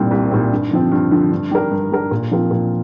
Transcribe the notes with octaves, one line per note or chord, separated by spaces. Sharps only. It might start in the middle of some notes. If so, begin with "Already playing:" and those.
Already playing: C2 A#2 G3 C4
C2
A#2 G3 C4
G2
D3 F3 C4
G2
D3 F3 C4
G2
G3 D4 A#4
G2
G3 D4 A#4
A#2
F3 C4 F4 A#4
A#2